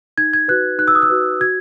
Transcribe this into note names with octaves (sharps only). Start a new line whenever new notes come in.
D#4 G#6
G#6
F#4 B4 F#6
D#4 F#6
E6
D#6
E6
F#4 B4
F#4 G#6